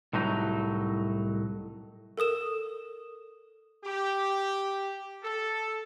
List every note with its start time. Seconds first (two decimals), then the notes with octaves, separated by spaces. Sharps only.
0.13 C2 A2 F#3 D#4
2.17 A4 A#4 D#6 E7
3.85 G4
5.24 A4